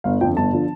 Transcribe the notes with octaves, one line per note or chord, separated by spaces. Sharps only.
G1 F5
F2 D3 F3 G5
G1 A5
D3 F3